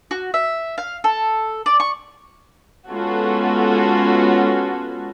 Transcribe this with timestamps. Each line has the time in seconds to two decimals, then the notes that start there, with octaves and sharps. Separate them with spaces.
0.11 F#4
0.34 E5
0.78 F5
1.04 A4
1.66 D5
1.80 C#6
2.90 G#3 B3 C#4 F4 F#4 A4